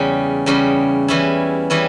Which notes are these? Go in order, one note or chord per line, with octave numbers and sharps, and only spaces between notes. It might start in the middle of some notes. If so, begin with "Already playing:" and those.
Already playing: E2 C#3 G3 C#4
E2 C#3 G3 C#4
E3 G3 C#4 E4
E3 G3 C#4 E4